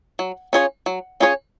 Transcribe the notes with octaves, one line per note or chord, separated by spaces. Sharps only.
F#3
C#4 F4 G#4 C#5
F#3
C#4 F4 G#4 C#5